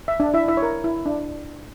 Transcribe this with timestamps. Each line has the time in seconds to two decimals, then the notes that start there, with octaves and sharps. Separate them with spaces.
0.08 E5
0.20 D4 D5
0.34 E4 E5
0.48 E4 E5
0.57 C#5
0.62 A#4
0.84 E4
1.06 D4